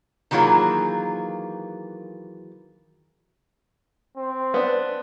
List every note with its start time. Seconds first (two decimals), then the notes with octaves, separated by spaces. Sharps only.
0.31 D#3 E3 F#3 A#3 F4 G#4
4.17 C4
4.54 B3 D4